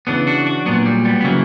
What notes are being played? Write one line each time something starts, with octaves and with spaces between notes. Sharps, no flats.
C#3 E3 B3 D4
D4 F#4
D4 F#4
A#2 F#3 B3 D4
G3
G3 B3
B3
C#3 E3 F#3 A#3